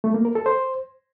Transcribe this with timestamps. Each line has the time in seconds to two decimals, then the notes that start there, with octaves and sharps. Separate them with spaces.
0.04 A3
0.14 A#3
0.25 A#4
0.35 A4
0.46 C5